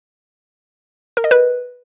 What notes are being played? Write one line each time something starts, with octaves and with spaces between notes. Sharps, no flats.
A#4
D#5
B4